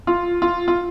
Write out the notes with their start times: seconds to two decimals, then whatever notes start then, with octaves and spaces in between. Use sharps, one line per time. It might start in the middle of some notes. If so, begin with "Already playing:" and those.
0.07 F4
0.42 F4
0.68 F4